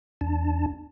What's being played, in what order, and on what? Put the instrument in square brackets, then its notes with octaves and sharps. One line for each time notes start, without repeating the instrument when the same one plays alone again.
[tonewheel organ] E2 D4 A5